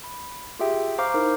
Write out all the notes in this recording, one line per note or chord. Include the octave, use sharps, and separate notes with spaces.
B5
F4 G4 G#4 E5 G5
C5 F5 A#5 C#6 D6 F6
D#4 E4 A#4 C5